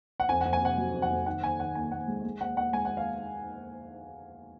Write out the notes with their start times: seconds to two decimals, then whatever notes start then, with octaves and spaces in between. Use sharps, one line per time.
0.20 F#5
0.29 F2 G#5
0.41 F2 F#5
0.53 G#5
0.62 C3 F#5
0.78 F#3
0.94 F2
1.02 F#5
1.10 F2
1.26 D#3 F#5
1.43 D#2 G#5
1.60 D#3 F#5
1.75 D#2 G#5
1.91 D#2 F#5
2.08 G#3
2.25 G#3
2.41 D#2 F#5
2.57 D#2 F#5
2.73 G#3 G#5
2.85 D#2 F#5
2.97 F5